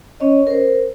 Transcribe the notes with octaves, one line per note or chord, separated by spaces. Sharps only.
C#4 C#5 D#5
A#4 C5